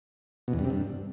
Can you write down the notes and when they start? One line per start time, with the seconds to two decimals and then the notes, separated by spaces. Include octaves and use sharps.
0.48 B2
0.53 E2
0.59 G2
0.65 C3
0.70 G2